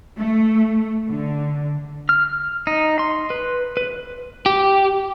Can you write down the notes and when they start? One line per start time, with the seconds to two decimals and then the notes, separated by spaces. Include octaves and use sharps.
0.18 A3
1.10 D3
2.09 F6
2.67 D#4
2.99 C6
3.30 B4
3.77 B4
4.46 G4